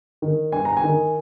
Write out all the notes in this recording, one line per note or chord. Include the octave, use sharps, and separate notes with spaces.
D#3
G2 G#5
A#5
G#5
D#3